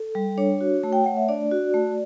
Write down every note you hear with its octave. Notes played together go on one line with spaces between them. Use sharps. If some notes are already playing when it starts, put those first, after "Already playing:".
Already playing: A4
G3
D4 C#5
F#4
A3
G5
A3 F#5
E5
D4 D5
F#4
A3